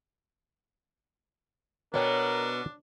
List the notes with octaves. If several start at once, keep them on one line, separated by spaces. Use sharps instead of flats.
B2 B3 D4 A#4 C#5 G5 A5